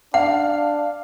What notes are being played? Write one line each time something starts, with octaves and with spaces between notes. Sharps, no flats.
D4 F5 F#5